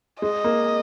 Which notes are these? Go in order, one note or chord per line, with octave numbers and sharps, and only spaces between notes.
G#3 D#5
A#3